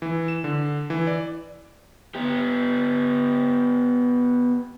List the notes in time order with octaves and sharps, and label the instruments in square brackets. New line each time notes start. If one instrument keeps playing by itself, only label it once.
[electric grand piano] E3
E7
D3
E3
D5
[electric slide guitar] B3 G4